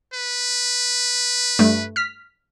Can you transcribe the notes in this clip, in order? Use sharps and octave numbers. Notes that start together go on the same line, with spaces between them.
B4
G2 G3 A3
F6 B6